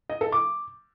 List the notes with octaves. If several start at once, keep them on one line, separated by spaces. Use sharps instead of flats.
D#5
A4
D6